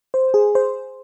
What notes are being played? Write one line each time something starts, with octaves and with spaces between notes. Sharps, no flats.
C5
G#4
C5